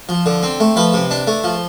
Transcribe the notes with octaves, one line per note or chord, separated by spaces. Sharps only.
F3
D3
C4
A3
F3 B4
C3
D4
A3
F3